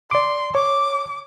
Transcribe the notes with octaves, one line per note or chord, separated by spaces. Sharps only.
D5 C6 D6
C#5 D6